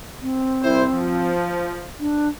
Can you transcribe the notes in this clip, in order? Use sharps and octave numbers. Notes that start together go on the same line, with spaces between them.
C4
C2 E4 C5
F3
D4